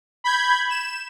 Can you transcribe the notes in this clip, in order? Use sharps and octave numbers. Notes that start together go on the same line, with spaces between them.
B5 G6 G#6
E7